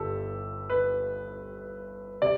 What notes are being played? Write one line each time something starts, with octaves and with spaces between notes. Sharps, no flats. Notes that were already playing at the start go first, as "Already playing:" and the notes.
Already playing: G1 G2 G4 A4
B4
C3 D5